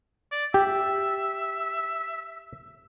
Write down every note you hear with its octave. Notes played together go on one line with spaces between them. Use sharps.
D5
G4 E5